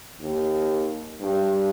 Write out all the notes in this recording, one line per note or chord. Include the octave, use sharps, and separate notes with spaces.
D#2
G2